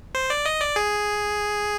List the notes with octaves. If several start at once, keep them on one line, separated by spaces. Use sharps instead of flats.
C5
D5
D#5
D5
G#4